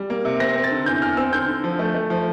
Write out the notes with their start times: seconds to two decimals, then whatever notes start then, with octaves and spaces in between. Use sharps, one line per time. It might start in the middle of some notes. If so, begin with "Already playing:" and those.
Already playing: G3
0.10 A#3
0.25 C3
0.40 C4 A#6
0.56 C4
0.64 A6
0.71 D3
0.86 E2 G6
1.02 E2 F6
1.17 C4 E6
1.33 D3 G6
1.48 D3
1.64 F3
1.79 A3
1.94 A3
2.10 F3